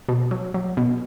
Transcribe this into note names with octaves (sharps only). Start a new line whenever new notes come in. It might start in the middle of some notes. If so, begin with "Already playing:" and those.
B2
F#3
F#3
B2